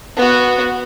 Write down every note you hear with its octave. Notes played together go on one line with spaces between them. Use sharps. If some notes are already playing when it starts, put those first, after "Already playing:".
B3 F#4